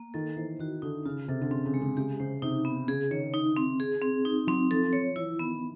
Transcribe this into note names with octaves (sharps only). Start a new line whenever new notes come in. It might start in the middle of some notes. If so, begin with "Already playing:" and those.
Already playing: A#3
D#3 A4
E3 C5
D#3 F#4
D3 D#4
C#3 F4
C3 A4
D3
C#3 C4
C#3
G#3
C#3
C#3 G4
C#3 C5
C3 D#4
B3
C#3 G#4
D#3 C#5
D#4
C4
G#4
C4
D#4
F#3 C4
F3 A4
F3 C#5
E3 E4
D#3 B3